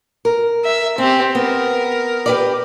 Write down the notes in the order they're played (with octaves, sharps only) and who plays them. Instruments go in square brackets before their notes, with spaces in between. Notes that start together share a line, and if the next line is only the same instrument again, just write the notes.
[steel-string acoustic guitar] A#4
[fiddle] E5
[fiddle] C4 G4 [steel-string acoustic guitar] C#4
[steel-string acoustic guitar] B3 [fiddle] A#4
[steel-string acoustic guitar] G4 B4 D5